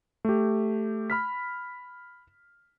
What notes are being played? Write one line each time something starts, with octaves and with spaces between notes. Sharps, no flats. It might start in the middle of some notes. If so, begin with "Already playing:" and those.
A3 G4
B5 F6 B6